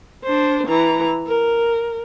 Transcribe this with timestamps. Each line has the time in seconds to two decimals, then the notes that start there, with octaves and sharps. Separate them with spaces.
0.23 D4 C5
0.67 E3 A#5
1.27 A#4